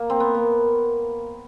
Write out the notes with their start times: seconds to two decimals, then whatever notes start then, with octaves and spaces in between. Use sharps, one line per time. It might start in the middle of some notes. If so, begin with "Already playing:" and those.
Already playing: A#3
0.10 C4
0.20 B3
0.35 A#3